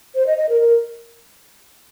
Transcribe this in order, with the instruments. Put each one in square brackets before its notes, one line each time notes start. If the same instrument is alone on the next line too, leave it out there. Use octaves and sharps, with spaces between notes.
[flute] C5
D#5
D#5
A#4
A#4